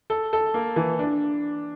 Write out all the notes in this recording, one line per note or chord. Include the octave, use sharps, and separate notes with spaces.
A4
A4
A#3
E3
D4